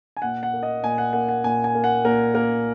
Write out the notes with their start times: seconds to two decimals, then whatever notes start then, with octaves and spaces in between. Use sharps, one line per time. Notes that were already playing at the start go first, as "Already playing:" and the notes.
0.17 G#5
0.22 A#2 F#5
0.43 F#5
0.53 A#3
0.63 D#5
0.83 A#2 G#5
0.98 F#5
1.13 A#3 F#5
1.29 F#5
1.44 A#2 G#5
1.64 G#5
1.75 A#3
1.84 F#5
2.05 A#2 A#4
2.34 A#3 A#4